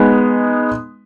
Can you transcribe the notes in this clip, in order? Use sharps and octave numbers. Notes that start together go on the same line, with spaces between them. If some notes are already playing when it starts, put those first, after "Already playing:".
Already playing: G#3 B3 D#4